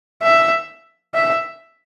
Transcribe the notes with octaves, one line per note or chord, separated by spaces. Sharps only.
E5
E5